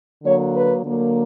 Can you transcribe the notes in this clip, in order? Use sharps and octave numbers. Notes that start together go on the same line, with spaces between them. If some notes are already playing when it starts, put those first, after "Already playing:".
D3 F#3 A#3 C#5
B4
D3 F#3 A#3